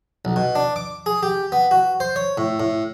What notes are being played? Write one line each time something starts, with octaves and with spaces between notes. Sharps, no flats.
B1
B2
D4
D6
G#4
G4
B3
F#4
C5
C#5
A2
A2